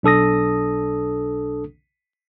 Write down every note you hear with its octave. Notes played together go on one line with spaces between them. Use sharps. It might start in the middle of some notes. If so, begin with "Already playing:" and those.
B1 D4 A4 D#6 A#6